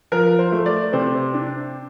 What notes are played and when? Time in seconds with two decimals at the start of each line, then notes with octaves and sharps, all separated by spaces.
0.12 F3 A#4
0.39 C5
0.52 A3
0.66 D5
0.93 C3 C5
1.34 D4